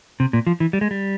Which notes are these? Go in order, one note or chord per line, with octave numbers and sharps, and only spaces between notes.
C3
A#2
F3
E3
G3
G#3
G3